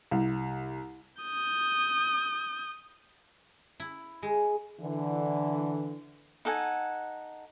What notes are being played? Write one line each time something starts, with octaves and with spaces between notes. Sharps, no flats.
C2
D#6 G6
E4
G#3
D3 E3
D#4 A4 F#5 G#5